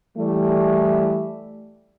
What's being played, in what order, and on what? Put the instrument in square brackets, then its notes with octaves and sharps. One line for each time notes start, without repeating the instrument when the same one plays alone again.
[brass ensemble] E3 G3 A3